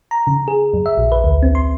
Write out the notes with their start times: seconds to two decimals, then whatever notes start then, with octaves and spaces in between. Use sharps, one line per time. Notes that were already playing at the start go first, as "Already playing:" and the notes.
0.11 A#5
0.27 C#3
0.48 G#4
0.73 F#2
0.86 E5
0.97 A#1
1.12 B4
1.24 D2
1.43 C4
1.55 C6